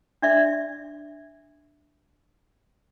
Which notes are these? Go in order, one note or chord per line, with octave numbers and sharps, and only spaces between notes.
D4 D5 E5